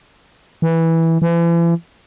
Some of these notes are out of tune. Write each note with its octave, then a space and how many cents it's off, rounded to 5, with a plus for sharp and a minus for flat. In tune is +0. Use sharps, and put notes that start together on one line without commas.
E3 -10
E3 +40